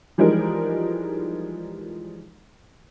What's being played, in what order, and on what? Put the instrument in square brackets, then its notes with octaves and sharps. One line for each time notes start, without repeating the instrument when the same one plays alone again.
[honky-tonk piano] E3 F3 G3 G#3 D#4 A#4